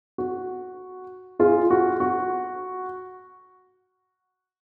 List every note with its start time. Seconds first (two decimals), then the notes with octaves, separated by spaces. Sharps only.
0.18 F#4
1.39 F4 G#4
1.70 F#4
2.00 F#4